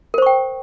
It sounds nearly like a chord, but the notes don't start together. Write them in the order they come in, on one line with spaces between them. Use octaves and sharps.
A#4 C5 C#6 G5